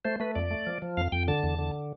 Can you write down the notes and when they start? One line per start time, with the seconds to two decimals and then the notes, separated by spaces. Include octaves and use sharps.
0.05 A3 C5
0.20 A3 B4
0.35 F2 D5
0.51 A3
0.67 F3
0.82 F3
0.97 F2 F5
1.12 F2 G5
1.28 D3 A5
1.43 E2
1.59 D3